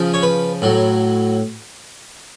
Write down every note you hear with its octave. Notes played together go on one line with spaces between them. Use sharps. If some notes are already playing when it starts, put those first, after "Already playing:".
Already playing: C#3 F3
C#5
B4
A2 F#3